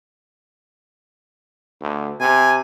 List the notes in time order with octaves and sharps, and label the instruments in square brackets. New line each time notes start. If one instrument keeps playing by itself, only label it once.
[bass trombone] D2
[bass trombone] C3 [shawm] G#5